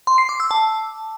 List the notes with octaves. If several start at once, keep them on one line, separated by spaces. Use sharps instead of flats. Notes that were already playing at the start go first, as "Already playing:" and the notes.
C6
C7
D6
E6
A5